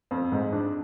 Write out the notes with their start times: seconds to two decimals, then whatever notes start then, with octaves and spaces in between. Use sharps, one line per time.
0.11 F2
0.32 G#2
0.52 D4